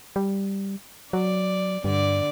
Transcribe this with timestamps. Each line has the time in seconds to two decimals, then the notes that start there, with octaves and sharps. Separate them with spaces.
0.16 G3
1.13 F#3 D5
1.84 G2 D3 D5